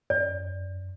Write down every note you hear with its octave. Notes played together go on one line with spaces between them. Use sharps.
F#2 D5